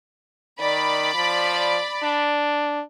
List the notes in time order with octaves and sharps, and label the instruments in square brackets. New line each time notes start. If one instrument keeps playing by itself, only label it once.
[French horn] D#3 [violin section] D5 B5
[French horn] F3
D4